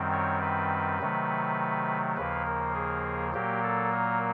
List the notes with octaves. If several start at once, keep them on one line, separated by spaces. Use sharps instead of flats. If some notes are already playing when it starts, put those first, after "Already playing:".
Already playing: F#2 D#3 G3 C4
C#5
B4
C3 D#3 F#3 A3
D#2 C#3 F3 A#3 B4
A#4
G#4
A#2 F#3 A#3 G4
A4
A#4